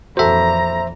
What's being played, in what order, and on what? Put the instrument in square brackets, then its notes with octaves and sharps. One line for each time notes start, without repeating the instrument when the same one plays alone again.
[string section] F2 A#2 E3 [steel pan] F#4 A4 [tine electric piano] C5 E5 [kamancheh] A#5